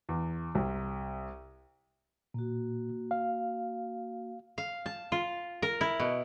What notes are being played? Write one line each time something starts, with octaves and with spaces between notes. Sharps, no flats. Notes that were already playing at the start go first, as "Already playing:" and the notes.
E2
C2
A#2 A#3 F#4
F5
F5
A5
F4
A#4
E4
B2